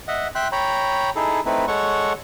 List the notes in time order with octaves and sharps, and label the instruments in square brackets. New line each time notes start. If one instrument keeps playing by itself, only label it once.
[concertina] D#5 E5 F#5
E5 G5 C6 F#6
C#5 G5 A#5 B5
D#4 E4 G#4 A4
A3 C4 D#4 E4 B4
G#3 A4 C#5 F#5 C#6